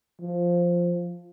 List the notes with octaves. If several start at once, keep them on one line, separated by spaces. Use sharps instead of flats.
F3